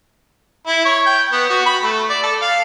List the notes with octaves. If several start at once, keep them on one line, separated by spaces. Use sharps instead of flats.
E4
C#5
G5
B3
F#4
B5
A3
D5
A4
F5